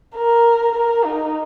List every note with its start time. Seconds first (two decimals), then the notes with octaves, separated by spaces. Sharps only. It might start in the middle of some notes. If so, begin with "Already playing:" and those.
0.16 A#4
0.75 A#4
1.04 D#4